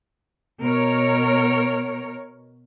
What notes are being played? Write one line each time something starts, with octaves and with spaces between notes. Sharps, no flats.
B2 A#4 C#5